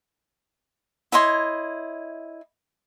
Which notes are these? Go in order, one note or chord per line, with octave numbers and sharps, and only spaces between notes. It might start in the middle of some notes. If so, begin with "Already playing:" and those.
E4 C#5 D#5 C6